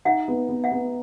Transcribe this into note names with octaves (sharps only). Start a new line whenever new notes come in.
D#4 E5 F#5
B3
B3
E5 F#5
B3